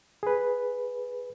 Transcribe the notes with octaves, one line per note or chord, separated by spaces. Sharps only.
G#4 B4